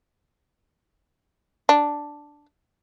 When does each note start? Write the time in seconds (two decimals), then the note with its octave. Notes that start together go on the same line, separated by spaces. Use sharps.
1.69 D4